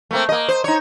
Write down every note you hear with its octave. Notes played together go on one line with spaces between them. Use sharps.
A3 A#3 C4
A#3 D#5
C5
D#4 C#5